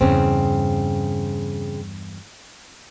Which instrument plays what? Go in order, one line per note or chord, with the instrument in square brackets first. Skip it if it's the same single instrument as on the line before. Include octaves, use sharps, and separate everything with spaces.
[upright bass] E2 G2 [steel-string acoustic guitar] C#3 C4